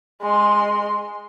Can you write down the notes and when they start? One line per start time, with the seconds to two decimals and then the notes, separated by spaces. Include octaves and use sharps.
0.22 G#3 C6